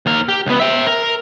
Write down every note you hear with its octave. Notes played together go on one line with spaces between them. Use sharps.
D#2 A#4
G4
C#2 B3
E5 G5
A#4